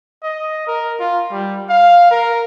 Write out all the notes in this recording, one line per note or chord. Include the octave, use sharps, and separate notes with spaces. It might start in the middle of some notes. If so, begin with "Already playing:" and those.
D#5
A#4
F4
G3
F5
A#4